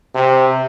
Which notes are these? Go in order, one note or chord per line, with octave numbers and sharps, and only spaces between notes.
C3